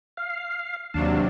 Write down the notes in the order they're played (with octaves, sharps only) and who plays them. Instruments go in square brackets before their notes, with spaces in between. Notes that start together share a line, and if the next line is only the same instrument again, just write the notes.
[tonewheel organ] F5
[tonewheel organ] D#2 F5 A5 [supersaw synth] C3 F#3 D4